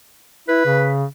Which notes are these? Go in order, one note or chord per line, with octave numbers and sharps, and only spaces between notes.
E4 B4
C#3